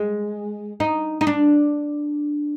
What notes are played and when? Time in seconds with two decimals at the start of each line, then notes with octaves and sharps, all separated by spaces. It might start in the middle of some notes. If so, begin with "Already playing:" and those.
Already playing: G#3
0.80 D#4
1.21 D#4
1.27 D4